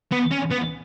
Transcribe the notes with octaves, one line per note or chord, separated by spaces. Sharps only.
B3
C#4
B3